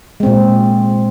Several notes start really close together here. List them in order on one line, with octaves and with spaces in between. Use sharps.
G#3 C4 A#2